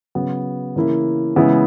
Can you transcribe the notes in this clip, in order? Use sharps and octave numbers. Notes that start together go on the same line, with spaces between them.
C#3 F#3 B3
C#3 E3 A#3 E4
C#3 E3 G#3 B3 E4